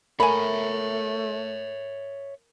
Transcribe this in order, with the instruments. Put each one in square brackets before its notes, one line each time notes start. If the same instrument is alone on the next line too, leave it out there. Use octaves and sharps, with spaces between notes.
[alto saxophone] A3 [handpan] A#4 [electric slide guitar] C#5 E5 [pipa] G#5 B5